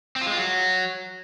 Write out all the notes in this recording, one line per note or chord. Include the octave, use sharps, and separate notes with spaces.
C4
F4
G#3
F4
F#3